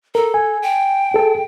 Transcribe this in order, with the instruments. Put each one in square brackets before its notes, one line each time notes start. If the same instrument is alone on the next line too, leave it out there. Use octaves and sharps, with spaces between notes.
[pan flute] A4 [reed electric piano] A#4
[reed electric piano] G#5
[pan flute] G5
[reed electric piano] G#4 A4